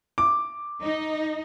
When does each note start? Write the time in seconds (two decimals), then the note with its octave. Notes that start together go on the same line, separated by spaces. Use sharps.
0.18 D6
0.82 D#4